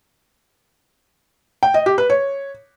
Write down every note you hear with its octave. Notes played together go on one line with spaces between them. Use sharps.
G5
D#5
G4
B4
C#5